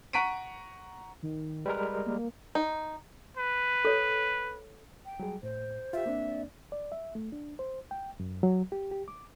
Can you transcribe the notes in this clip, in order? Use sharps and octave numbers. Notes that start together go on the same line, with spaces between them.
F#5 A#5 C#6 B6 D7 D#7
D#3
G3 G#3 A#4 B4
A#3
D#4
B4
A4 C#5
G5
F#3 G3 G#4
A2 C5
F4 G4 E5
A#3 C4 D4
D5
D5
E5
A3
D4
C5
G5
F#2
F#3
G4
G4
D6